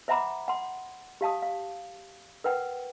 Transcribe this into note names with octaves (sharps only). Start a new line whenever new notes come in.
C5 E5 F#5 A#5 B5 D6
F#5 C6
G4 F5 A5 D#6
F5
A#4 B4 F#5 G5